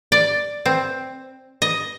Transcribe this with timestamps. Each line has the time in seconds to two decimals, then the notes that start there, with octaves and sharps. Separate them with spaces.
0.12 D5
0.66 C4
1.62 D#5